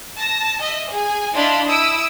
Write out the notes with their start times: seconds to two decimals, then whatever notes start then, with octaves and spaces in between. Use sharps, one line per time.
0.17 A5 A#6
0.61 D#5 E5
0.90 G#4 G#5
1.33 D4 E4 D#5 F5 B5 C6
1.68 E4 D#6 E6 D7